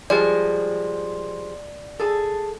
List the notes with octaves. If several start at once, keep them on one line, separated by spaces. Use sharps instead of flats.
F3 G3 G#3 D5
G#4 A4